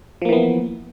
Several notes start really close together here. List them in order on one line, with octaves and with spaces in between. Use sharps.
F3 A#3 E3 B3